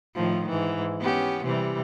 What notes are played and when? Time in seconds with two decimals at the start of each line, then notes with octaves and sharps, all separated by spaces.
0.15 A2 D#3 F3
0.49 G#2 E3
1.00 B3 C#4 G4
1.44 C3 E3 G3